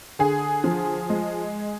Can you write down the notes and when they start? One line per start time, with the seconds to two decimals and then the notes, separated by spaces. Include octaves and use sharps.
0.19 D3 G#4
0.64 F3
1.10 G#3